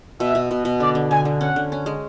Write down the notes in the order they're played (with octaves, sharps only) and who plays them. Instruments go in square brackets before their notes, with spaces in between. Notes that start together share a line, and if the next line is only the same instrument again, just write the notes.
[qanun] B2 [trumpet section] E5
[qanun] B2
B2
B2
[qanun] D3 [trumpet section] D5
[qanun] D3
[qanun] D3 [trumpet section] G#5
[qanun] D3
[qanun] C#4 [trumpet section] F#5
[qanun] D3
C#4
G#3